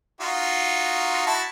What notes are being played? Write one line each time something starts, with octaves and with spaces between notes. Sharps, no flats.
D#4 F4 F#4
E4 F#4 A5